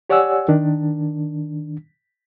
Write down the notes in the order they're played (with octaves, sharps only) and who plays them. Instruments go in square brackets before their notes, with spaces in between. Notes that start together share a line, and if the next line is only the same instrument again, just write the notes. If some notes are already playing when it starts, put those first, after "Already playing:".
[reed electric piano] G4 C#5 D5 F#5 G#5 E6
D#3 D4